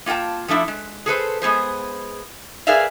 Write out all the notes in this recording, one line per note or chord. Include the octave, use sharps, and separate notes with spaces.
A#3 F4 F#5 G5 A5
F3 A3 D4 E4
G#3
G#4 A4 B4 C5
G#3 B3 G#4 C5
G#4 A#4 B4 D5 E5 F5